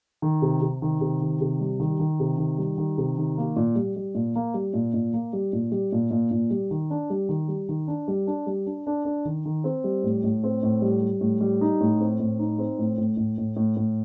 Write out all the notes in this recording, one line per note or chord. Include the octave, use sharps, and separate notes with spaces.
D#3
C3
C3
D#3
C3
D#3
C3
G3
D#3
D#3
C3
D#3
G3
D#3
C3
D#3
A#3
A#2
G3
G3
A#2
A#3
G3
A#2
A#2
A#3
G3
A#2
G3
A#2
A#2
A#2
G3
D#3
D4
G3
D#3
G3
D#3
D4
G3
D4
G3
D4
D4
D4
D#3
D#3
C4
G3
A2
A2
C4
A2
G3
G3
A2
G3
D#4
A2
C4
A2
D#4
C4
A2
A2
A2
A2
A2
A2